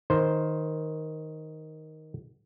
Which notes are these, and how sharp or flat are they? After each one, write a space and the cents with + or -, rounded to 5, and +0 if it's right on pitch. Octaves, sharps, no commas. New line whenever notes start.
D#3 +5 C5 +0